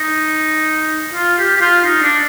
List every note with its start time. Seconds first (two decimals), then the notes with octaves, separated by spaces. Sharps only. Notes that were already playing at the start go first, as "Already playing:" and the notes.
Already playing: D#4
1.14 F4
1.39 G4
1.56 G4
1.61 F4
1.85 D#4
2.02 D4